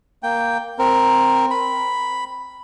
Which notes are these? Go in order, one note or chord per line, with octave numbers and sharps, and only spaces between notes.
A#3 G5
C4 A#4
B5